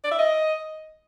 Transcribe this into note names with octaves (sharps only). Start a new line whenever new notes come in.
D5
E5
D#5